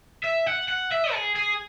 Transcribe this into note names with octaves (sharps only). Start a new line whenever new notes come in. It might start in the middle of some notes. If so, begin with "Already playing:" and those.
E5
F#5
F#5
E5
G#4
G#4